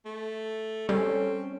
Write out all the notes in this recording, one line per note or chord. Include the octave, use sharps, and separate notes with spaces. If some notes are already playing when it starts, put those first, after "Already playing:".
A3
G3 C4 C#4 A4